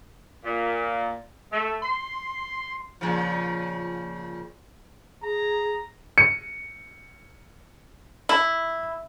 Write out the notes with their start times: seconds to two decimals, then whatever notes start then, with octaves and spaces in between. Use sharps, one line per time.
0.44 A#2
1.52 A3
1.82 C6
3.01 A#2 C#3 F3
5.23 G#4 A#5
6.18 C#7
8.29 E4